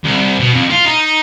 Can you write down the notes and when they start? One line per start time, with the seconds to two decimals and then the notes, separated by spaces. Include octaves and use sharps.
0.04 C2
0.39 B2
0.53 F2
0.70 F4
0.86 D#4